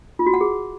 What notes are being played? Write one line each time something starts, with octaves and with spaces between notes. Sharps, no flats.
F4
F#4
F#5
G#4